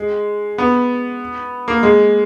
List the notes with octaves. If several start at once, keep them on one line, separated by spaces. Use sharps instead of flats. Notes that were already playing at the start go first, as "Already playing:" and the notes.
Already playing: G#3
B3
A#3
G#3